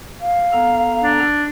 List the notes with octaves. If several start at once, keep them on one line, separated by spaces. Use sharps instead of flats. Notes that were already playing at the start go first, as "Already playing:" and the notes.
F5
B3 A4 A#5
D4